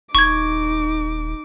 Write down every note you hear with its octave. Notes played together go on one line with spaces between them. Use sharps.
D#1 D#4 C#6 D6 G#6